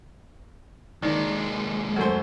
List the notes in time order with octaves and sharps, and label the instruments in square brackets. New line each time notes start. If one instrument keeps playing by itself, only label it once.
[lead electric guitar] D#2 G#3 [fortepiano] D#3 D4
[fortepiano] F#2 A3 C5